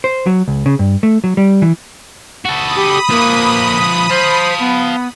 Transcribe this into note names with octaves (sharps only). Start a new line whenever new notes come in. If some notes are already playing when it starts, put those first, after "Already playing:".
C5
F#3
C#2
C#3
G2
A3
F#3
G3
E3
F#4 A4 B5 D#6
G4
F3 A#3 B4
C5 F5 A5
B3